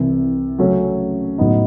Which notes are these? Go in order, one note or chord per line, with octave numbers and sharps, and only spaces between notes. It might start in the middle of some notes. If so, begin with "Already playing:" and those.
Already playing: C2 C3 E3
C#3 F#3 A3 C#4
A2 F#3 B3 D#4